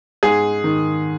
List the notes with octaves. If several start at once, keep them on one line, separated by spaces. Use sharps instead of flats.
G#2 G#4
D#3